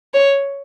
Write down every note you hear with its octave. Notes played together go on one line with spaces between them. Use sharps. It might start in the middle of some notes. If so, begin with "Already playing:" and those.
C#5